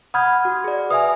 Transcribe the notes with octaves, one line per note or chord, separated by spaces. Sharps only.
F#5 B5 D#6 F6 G6 G#6
F#4
G#4 D5
B4 E5 G#5 D#6